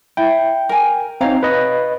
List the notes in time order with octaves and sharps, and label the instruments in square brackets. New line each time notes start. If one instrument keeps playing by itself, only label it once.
[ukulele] E4 [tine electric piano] G5
[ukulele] A#4 G#5
[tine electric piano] C4 D#4 [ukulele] C#5 F5 A#5
[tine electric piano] B4 D#5